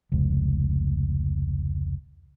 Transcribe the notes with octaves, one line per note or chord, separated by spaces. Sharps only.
F1 C#2